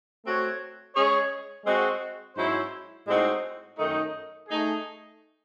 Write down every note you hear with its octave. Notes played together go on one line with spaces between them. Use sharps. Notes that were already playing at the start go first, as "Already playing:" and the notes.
A3 C4 F#4 C#5
G#3 C#4 G#4 C#5
G#3 C4 F#4
G#2 F#3 C#4 E4 C5
A2 G#3 C4 D#4 F#4
F#2 D#3 A3 D#4
A3 D#4 G#4